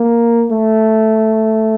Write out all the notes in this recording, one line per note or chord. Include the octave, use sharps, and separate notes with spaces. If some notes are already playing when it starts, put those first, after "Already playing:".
Already playing: A#3
A3